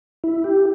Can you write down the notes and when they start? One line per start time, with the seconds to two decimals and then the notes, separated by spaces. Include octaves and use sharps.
0.24 E4
0.44 G4